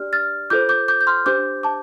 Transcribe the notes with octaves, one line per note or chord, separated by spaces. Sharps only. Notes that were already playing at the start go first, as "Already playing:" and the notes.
Already playing: D4 G4 D5 F6
F6 A6
F4 A4 C5 D6 G6
D6 G6
D6 G6
G6
C6 F6
D4 G4 C5 D6 G6
A5 D6